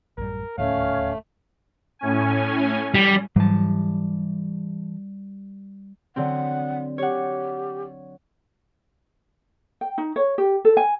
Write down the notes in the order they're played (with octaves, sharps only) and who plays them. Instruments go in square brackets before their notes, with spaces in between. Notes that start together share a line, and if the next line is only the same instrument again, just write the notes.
[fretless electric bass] A1 F#2 G3 [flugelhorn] A#4
[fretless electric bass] D#1 D2 A2 [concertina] A3 [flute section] C#4 C#5 [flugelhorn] F5
[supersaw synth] A2 C#4 G#5
[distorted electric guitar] G3
[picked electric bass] G#2 F#3 [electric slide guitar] E3 A5 [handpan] G3
[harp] D3 F#3 C4 [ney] F#5
[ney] G4 [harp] C#5 F#5
[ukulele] G5
D#4
C#5
G4
A4
G#5